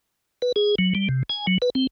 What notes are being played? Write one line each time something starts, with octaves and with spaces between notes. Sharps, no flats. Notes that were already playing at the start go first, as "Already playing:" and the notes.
B4
G#4
F#3
G3
C3
G#5
F#3
B4
C4